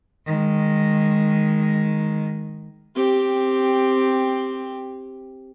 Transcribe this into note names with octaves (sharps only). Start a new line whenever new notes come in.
D#3 G#3
C4 G4